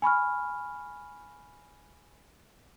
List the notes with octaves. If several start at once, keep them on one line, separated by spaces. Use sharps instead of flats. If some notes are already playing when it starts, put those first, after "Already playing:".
G#5 B5 C#6 F6